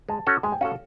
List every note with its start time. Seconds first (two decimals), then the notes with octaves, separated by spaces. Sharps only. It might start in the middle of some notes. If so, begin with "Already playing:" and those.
0.09 G#3 A5
0.27 C#4 F#4 A4
0.43 G#3 G#5
0.52 G5
0.61 C#4 F#4 A4 F5